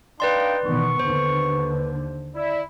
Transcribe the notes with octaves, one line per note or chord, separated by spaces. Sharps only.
D4 D#4 B4 D5 F5 G5 C6
B2 D#3 E3 B3 C#6
D#2 D3 B4 C5
E4 D5